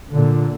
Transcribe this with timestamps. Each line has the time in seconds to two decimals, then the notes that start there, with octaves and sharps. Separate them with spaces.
0.13 A#2 D3